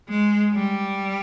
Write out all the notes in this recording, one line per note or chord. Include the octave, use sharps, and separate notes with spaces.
G#3
G3